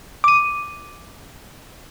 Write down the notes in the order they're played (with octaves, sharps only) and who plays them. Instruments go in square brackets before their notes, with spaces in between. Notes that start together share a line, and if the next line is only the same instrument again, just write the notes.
[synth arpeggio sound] D6 D#7